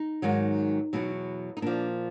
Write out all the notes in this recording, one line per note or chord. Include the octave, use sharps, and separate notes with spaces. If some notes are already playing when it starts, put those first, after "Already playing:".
Already playing: D#4
G#2 D#3 F#3
E2 B2 F#3
D#4
A#2 F3 D4